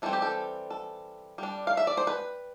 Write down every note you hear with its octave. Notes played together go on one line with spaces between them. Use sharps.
E3 G3 C4 A4
G4
A4
A4
G3 D4
F5
E5
D5
C5
B4